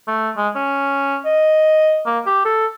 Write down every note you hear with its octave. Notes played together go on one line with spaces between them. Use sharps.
A3
G#3
C#4
D#5
A#3
G4
A4